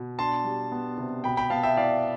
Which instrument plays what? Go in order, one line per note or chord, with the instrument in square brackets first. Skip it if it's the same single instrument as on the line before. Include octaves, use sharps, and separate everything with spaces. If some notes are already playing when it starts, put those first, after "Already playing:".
Already playing: [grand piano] B2
D4 A5 C6
G3
B3
C3
B2 G5 B5
G5 B5
B3 F5 A5
E5 G5
E4 D5 F5